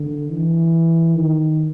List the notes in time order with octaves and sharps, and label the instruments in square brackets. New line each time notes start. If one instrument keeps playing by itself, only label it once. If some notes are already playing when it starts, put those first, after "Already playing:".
Already playing: [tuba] D3
E3
D#3